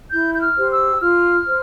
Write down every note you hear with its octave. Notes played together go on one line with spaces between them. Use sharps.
E4 G6
G6
F6
G4 C5
E6
F4 F6
C5